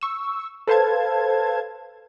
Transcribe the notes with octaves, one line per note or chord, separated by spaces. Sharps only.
C#6 E6
A4 B4 C5 F5 A5 G#6